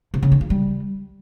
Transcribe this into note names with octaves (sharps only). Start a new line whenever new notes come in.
C3
C#3
D#3
F3
G3